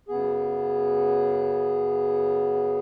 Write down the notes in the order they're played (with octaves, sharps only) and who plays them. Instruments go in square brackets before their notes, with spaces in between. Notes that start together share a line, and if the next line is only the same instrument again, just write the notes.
[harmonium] F#2 C#3 B3 G#4